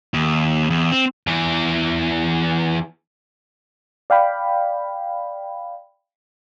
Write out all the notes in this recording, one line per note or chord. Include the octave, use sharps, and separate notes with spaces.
D#2
E2
C4
E2 E3
D5 F5 G5 B5